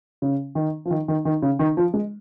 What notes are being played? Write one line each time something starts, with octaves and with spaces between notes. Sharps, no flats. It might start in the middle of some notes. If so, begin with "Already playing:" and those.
C#3
D#3
F3
D#3
D#3
D#3
C#3
D#3
F3
G#3